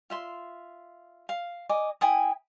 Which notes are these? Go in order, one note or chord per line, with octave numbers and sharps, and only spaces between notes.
F4 E5 C6
F5
D#5 G#5 D6
E4 G5 G#5 D#6